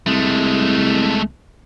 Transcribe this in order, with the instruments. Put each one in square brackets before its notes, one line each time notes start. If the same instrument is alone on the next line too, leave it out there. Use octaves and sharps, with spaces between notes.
[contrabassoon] C2 [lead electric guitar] G#3 A3